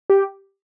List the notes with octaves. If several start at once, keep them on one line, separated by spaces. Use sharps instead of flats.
G4